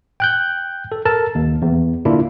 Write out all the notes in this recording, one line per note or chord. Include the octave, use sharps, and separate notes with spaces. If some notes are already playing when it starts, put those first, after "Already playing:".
G5 F#6 G6
A4
A4 A#4 A5
D#2
E2
D3 A#3 D4 E4 F4